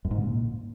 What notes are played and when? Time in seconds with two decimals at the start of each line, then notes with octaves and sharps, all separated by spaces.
0.05 F#2
0.11 G#2
0.17 C#3
0.23 A#2